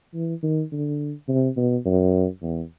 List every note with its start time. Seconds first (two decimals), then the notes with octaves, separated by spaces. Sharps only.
0.14 E3
0.43 D#3
0.72 D3
1.28 C3
1.57 B2
1.86 F#2
2.42 E2